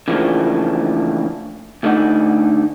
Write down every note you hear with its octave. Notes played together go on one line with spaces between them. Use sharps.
C#3 E3 F3 A3 A#3 D4
D2 D3 A3 D#4 F#5